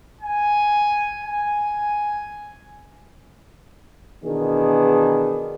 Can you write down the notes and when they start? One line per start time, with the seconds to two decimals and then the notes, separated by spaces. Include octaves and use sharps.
0.21 G#5
1.23 G#5
4.24 B2 D#3 E3 B3 D4 G#4